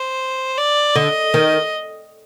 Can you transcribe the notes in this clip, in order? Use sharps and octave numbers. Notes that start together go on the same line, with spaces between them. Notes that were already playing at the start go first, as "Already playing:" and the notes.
Already playing: C5
D5
D3 D#5
D#3